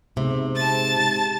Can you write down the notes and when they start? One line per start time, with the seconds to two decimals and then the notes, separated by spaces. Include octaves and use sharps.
0.17 G#2 C3
0.55 A5 A6